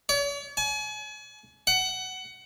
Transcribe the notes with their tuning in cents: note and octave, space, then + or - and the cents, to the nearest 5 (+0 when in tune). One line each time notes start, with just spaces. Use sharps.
C#5 +45
G#5 +35
F#5 +20